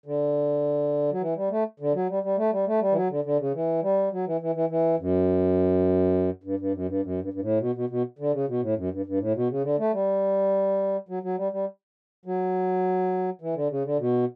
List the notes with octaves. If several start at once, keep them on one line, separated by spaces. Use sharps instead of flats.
D3
F#3
E3
G3
A3
D3
F#3
G3
G3
A3
G3
A3
G3
E3
F#3
D3
D3
C#3
E3
G3
F#3
E3
E3
E3
E3
F#2
G2
G2
F#2
G2
F#2
G2
G2
A2
B2
B2
B2
D3
C#3
B2
A2
F#2
G2
G2
A2
B2
C#3
D3
A3
G3
F#3
F#3
G3
G3
F#3
E3
D3
C#3
D3
B2